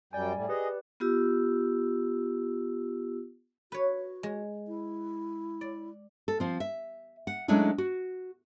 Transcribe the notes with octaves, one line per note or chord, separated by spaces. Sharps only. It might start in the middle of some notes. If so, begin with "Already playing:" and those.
F#2 G3 D5 G5 G#5
A2 G3
G4 G#4 B4 D5 D#5
B3 F4 G4 E6
F#4 B4 C#5
G#3
E4
D5
A4
F3 C4
E5
F#5
F#3 G#3 A3 C#4 D4 E4
F#4